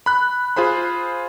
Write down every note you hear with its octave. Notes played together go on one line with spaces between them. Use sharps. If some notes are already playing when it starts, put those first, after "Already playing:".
B5 F#6
F4 G#4 C5 B5